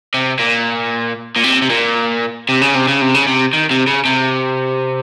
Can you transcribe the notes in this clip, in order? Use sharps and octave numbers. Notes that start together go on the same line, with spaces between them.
C3
A#2
A#2
C3
C3
A#2
C3
C#3
C3
C#3
C3
C#3
C3
D#3
C3
C#3
C3